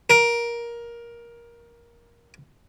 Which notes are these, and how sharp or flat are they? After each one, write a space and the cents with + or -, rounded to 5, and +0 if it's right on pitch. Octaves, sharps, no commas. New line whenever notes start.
A#4 +15